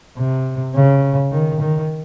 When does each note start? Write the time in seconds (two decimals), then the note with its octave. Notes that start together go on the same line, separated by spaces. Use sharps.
0.18 C3
0.75 C#3
1.32 D#3
1.60 D#3